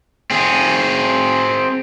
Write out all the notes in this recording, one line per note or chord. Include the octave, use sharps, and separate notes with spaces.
C4 G#4